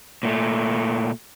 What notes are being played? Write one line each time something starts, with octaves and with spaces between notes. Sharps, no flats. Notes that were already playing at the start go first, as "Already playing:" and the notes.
A#2 A3